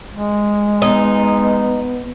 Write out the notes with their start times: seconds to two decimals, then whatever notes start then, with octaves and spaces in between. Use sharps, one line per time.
0.15 G#3
0.82 B3 D#4